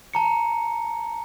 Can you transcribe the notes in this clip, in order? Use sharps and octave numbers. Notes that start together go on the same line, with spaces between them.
A5 A#5 C#7